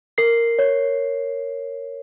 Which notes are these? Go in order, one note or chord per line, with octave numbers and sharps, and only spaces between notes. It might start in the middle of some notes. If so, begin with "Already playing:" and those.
A#4 C7
C#5